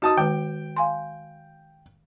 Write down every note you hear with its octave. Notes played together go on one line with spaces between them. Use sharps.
D#4 F#4 A5 D#6
D#3 G#3 B4 G5
F5 G#5 C6